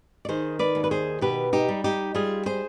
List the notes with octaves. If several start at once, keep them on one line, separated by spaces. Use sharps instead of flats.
D5
D#3 G#4 C5
B4 D5
D#2
B4
G#4 C5
B2 G4 B4
D#4 G4
G3
D#4 G4
G3 F4 G#4
G#4 C5